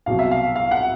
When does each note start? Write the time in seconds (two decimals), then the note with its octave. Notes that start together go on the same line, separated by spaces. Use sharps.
0.06 C2 B2 F#3 F5
0.19 E5
0.31 F5
0.56 F5
0.71 F#5